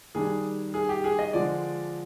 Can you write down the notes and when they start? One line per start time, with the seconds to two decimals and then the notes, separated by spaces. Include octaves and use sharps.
0.15 D#3 G3 D4 G#4
0.74 G#4
0.89 G4
1.04 G#4
1.19 D#5
1.33 D3 F3 G#3 D4 D5